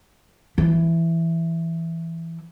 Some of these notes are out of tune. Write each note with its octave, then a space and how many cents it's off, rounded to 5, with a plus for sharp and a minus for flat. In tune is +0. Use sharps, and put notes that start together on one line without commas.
E3 +5